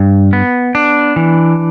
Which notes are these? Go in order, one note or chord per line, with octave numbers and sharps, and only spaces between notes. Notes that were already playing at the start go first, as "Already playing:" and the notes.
Already playing: G2
B3
D4
E3